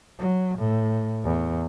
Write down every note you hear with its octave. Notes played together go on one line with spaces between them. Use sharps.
F#3
A2
E2